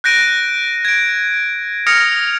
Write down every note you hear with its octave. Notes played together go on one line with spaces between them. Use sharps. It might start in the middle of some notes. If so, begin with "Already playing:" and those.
F#6 G6 A#6 D7 D#7
G#6 D7
D#6 F6 G#6 A#6 C#7 F7